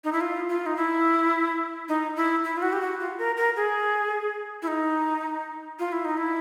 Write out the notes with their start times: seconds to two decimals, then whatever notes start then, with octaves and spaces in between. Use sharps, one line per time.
0.04 D#4
0.13 E4
0.21 F4
0.49 F4
0.66 D#4
0.77 E4
1.88 D#4
2.16 E4
2.44 E4
2.57 F4
2.62 F#4
2.73 G4
2.81 F#4
3.00 F4
3.18 A#4
3.37 A#4
3.56 G#4
4.62 E4
4.68 D#4
5.79 F4
5.92 E4
6.05 D#4
6.17 E4